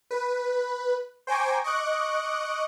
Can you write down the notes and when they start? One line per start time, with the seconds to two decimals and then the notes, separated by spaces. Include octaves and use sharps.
0.11 B4
1.27 C5 G5 G#5 A#5 C#6 D6
1.64 D#5 C#6 D6 F#6